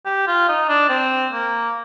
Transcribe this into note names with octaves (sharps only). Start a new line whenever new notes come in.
G4
F4
D#4
D4
C4
A#3